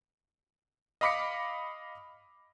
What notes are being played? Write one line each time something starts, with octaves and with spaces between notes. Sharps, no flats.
D#5 F5 B5 D6 B6 C#7